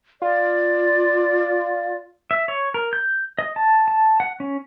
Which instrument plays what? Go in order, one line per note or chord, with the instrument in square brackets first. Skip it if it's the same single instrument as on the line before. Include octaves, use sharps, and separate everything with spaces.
[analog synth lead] F4 [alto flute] D5
[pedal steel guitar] E5
C#5
A#4
G6
D#5
A5
A5
F#5
C#4